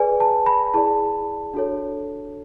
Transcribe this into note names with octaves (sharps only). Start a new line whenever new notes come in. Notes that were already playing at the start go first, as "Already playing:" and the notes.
Already playing: G#4 B4 D5 G#5
A5
B5
E4 G#4 D5 A5
D4 F#4 A4 C#5